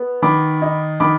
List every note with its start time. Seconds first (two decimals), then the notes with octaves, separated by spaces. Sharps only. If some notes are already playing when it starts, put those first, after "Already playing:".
Already playing: B3
0.22 D#3 B5 D6
0.62 D#4
1.00 D#3 B5 D6